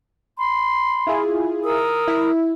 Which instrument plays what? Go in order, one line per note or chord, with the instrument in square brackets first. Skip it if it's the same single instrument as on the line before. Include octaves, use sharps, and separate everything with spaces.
[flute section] B5 C6
[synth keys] E4 F4 G#4
[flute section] A#4 D#6 E6
[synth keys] E4